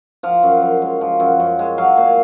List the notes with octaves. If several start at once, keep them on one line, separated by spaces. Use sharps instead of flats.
F3 F5
F#2
F#2
G#3
F3
F#2
F#2
G#3
F#3 F5
A#2